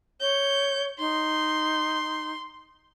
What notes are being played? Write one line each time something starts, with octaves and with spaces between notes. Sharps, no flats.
C#5 G6
D#4 C6